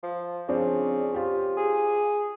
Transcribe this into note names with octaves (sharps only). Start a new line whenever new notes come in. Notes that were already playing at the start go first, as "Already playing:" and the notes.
F3
C#3 F3 C4 D4
F4 G4 C5
G#4